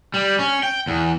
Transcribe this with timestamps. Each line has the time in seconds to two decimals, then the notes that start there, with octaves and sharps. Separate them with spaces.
0.14 G3
0.39 C#4
0.63 G5
0.87 E2